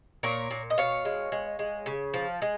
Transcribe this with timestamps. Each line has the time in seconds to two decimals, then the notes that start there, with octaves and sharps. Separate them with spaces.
0.23 A#2 A#4 C#5
0.51 A#2
0.70 D#5
0.78 B2 C#5 F5
1.05 G#3
1.32 G#3
1.59 G#3
1.86 C#3
2.14 F3
2.42 G#3